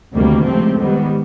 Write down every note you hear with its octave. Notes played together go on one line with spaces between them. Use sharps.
D2 C3 D#3 G3 A#3
C#2 C3 F3 A3 C4
G#2 D#3 G3 B3